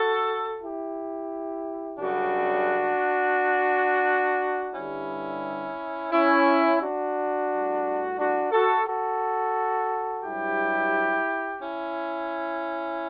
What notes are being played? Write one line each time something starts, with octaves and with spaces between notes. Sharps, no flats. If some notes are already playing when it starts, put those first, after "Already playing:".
Already playing: F#4 A4
E4 G4
F#2 C#3 G3 D4 F#4
G2 D3 G3 C#4 E4
C#4 E4
D4 F#4
A2 G3
D4 F#4
F#4 A4
F#4 A4
G2 F#3 E4 G4
C#4 E4